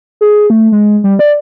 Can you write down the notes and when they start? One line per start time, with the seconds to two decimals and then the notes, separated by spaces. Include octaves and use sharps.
0.21 G#4
0.50 A3
0.72 G#3
1.04 G3
1.19 D5